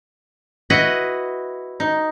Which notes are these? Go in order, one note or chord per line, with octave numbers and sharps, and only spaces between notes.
E4 F#4 B4 D#5 F#5
D#4